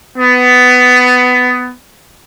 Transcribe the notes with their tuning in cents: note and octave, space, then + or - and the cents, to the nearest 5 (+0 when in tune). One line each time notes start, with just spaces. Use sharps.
B3 +15